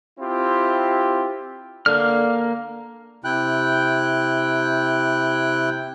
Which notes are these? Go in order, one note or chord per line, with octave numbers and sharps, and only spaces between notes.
C4 E4 F4 G4
D3 A#3 F6
C3 E4 G5 F#6